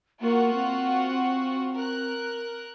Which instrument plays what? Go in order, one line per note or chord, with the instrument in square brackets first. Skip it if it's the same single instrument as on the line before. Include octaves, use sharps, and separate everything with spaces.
[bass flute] A#3 [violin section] F4 F#4 F#5
[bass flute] C4
[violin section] A#4 F#6